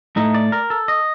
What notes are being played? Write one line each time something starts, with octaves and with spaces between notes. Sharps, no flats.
A2 A3 D#4
D5
A#4
A4
D#5